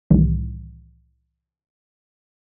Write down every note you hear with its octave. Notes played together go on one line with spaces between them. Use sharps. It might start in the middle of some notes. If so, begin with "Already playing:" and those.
C2 A2 D#3 E3 G3